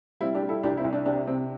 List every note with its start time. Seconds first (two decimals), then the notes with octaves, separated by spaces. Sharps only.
0.21 G3 C4 E4
0.35 D4 G4
0.43 G3
0.49 E4 A4
0.63 C2 D4 G4
0.77 C4 E4
0.85 C2
0.93 D4
1.06 C3 D4
1.27 C3 C4